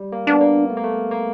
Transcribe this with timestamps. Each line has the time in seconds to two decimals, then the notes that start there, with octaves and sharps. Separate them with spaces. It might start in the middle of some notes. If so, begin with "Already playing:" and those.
Already playing: G3
0.12 A#3
0.27 B3 D4
0.41 A#3
0.70 A3
0.77 A#3
0.84 A3
1.11 A#3